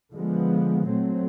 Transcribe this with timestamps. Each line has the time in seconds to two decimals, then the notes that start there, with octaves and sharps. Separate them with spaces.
0.12 D3 F3 G#3 B3
0.87 A#2 F#3 A3 C4